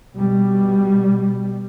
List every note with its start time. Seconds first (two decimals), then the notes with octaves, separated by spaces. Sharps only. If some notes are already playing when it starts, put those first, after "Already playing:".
0.14 B2 G3